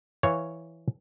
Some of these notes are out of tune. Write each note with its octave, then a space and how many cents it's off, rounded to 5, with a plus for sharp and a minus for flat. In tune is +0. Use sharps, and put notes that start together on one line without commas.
E3 +0 C#5 +0 F5 +0